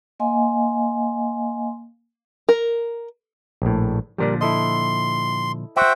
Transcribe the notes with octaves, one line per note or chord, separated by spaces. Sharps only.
A#3 D#5 F5 G#5 C6
A#4
A#1 A2
A#2 D3 F3 G3 A#4 D5
E4 A4 D#5 C6
F#4 C5 E5 G5